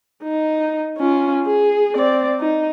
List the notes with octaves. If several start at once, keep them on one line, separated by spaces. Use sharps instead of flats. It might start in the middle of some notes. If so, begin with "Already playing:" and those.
D#4
C#4 F4
G#4
C4 D5
D#4